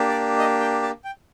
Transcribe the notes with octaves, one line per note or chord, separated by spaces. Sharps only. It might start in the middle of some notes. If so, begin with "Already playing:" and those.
Already playing: A#3 D4 G4
D5
D#5
G5
A5
G5